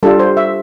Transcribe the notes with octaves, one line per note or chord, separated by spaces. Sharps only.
G3 D4 F4 A4
C5
E5